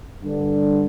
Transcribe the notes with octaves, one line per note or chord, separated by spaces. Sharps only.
G2 D3